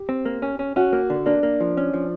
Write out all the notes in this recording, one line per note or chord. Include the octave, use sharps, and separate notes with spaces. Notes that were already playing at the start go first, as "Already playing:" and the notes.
Already playing: G4
C4
A#3
C#4
C#4
C#4 F#4
A#3
D3
A#3 D4
A#3
F3
C#4
F3